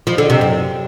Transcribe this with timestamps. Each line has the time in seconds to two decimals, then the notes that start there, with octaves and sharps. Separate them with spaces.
0.07 F3
0.18 D3
0.30 C3
0.41 F#2